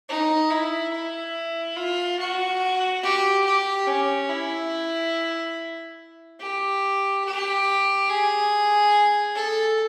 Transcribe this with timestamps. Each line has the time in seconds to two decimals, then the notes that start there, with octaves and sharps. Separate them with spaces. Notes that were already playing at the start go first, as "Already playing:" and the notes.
0.09 D#4
0.50 E4
0.93 E4
1.76 F4
2.20 F#4
3.03 G4
3.45 G4
3.87 C#4
4.29 E4
6.40 G4
7.25 G4
8.09 G#4
9.35 A4